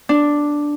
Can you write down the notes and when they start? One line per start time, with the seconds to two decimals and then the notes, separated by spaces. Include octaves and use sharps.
0.09 D4